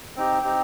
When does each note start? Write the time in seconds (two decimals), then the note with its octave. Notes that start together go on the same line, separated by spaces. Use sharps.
0.16 C4 D#4 G4
0.44 C4 D#4 G4